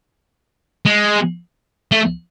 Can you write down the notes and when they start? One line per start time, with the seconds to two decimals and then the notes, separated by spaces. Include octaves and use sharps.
0.86 G#3
1.92 A3